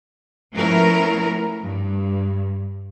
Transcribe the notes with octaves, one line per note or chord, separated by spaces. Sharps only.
F3 A3 B3 C#4 E4 A#4
G2